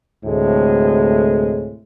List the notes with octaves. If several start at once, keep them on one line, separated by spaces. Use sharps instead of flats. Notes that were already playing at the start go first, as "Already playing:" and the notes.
D2 A2 C3 G#3